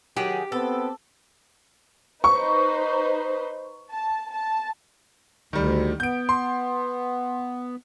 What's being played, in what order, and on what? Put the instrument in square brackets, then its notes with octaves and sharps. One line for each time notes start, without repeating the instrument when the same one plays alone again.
[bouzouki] D#3 G#4 F#5 [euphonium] F#3 [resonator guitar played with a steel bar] G4
[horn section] B3 [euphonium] C4 [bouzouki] A4
[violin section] D#4 B4 C5 [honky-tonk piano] C#6
[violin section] A5
A5
[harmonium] D2 [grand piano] D#3 G3
[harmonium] B3 [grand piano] G6 D7
[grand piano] C6